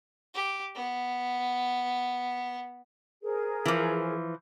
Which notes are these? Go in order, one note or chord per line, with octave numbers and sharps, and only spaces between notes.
G4
B3
G#4 A#4 C5
E3 F3